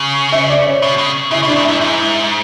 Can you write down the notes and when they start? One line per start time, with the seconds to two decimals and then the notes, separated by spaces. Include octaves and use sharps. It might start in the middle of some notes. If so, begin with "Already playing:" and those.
Already playing: C#3
0.32 E5
0.50 D5
0.66 C#5
0.82 B2
0.99 C#3
1.31 C#3 E4
1.43 B2
1.47 D4
1.56 G#2
1.64 E4
1.68 F#2
1.81 G#2 E4